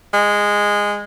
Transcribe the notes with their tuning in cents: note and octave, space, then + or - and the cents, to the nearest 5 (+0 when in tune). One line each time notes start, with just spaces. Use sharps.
G#3 -10